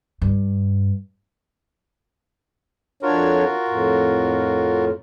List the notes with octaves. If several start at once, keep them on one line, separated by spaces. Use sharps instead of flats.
G2
F2 D4 F4 F#4 A#4 C#5
F2 A2